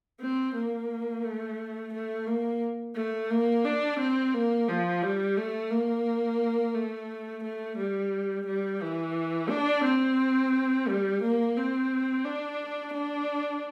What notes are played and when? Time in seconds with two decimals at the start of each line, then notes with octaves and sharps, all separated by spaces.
0.20 C4
0.55 A#3
1.24 A3
1.93 A3
2.27 A#3
2.96 A3
3.30 A#3
3.64 D4
3.99 C4
4.34 A#3
4.68 F3
5.02 G3
5.37 A3
5.71 A#3
6.74 A3
7.43 A3
7.77 G3
8.46 G3
8.81 E3
9.49 D4
9.84 C4
10.88 G3
11.22 A#3
11.57 C4
12.25 D4
12.93 D4